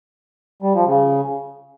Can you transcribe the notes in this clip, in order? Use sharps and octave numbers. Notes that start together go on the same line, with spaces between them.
G3
F3
C#3